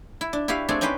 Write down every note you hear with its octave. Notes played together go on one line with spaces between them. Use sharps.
E4
D4
E4 F#4 G4 B4 F5
A3 C4 D4 G#4 G#5
C#4 D#4 G4 B4 C5 G5